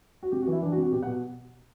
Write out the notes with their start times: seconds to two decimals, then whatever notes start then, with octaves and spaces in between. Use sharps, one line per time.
0.23 F#4
0.32 C3 G4
0.42 F#4
0.47 E3 E4
0.62 E3 D4
0.72 F#4
0.78 C3
0.83 F#4
0.92 B2 G4
1.03 F#5
1.07 B2